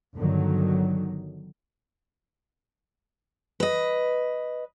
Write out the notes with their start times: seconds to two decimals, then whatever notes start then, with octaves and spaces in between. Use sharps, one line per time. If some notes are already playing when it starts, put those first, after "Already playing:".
0.15 G1 D3 D#3 F#3
3.60 B4 D#5